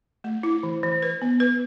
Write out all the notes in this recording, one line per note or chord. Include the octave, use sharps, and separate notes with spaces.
A3
E4
E3
E3
B4
B3
B4